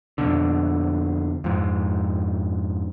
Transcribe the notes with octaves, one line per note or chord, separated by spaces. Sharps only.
F2 B2 D3
F2 G#2